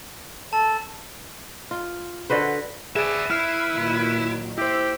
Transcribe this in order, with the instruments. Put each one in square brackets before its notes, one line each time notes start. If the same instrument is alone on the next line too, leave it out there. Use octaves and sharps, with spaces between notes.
[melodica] A4 [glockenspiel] A5
[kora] F4
D3 F#4 B4 C5
[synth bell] G#4 [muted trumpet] B4 [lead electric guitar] D5 E5
[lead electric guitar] E4 [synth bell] F6 C7
[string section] A#2 D#3 F#3
[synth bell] E4 C5 [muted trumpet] G4 [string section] E6